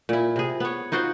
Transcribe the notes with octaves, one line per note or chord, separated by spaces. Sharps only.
A#2 E4
C3 G#4
B3 C#5
D#4 F4 F#4 C5